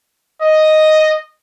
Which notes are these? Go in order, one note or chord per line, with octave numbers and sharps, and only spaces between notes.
D#5